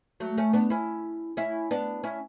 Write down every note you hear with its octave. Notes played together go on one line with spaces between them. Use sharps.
F#3 A3
A3 C#4
B3 D4
C#4 E4
C#4 E4
B3 D4
C#4 E4